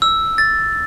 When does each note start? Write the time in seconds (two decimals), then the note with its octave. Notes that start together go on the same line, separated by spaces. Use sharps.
0.02 E6
0.38 A6